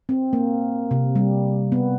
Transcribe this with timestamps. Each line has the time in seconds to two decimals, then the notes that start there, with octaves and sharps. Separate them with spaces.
0.09 C4
0.33 A#3
0.91 C3
1.15 G3
1.72 B3